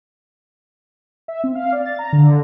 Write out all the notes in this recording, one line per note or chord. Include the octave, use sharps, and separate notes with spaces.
E5
C4
F5
D5
A6
A#5
D3